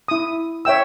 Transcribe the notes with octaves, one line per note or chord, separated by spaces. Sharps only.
E4 D#6
C#5 E5 G5 E6